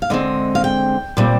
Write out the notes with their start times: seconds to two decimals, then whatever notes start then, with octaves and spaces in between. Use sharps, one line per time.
0.02 F5
0.10 D3 G#3 C4 D#5
0.55 F5
0.64 G5
1.17 A#2 G3 C4